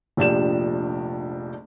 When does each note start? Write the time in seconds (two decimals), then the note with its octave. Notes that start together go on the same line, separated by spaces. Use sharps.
0.17 F1 A#1 F3 D4 G4 E7